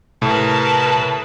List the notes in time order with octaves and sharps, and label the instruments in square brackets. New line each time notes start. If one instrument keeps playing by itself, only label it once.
[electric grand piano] A2 [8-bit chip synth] C3 [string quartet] A#4 B4 A5